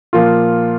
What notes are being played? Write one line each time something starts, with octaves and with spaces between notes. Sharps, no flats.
A#2 F3 A#3 F4